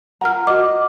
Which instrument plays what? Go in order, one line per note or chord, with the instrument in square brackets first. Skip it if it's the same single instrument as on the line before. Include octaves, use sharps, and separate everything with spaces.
[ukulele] F4 A#4 A#5 [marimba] F#5 F6
[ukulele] F#4 D#5 [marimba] D6